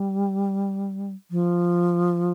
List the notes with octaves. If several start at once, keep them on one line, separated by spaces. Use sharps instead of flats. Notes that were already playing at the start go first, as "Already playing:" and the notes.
Already playing: G3
F3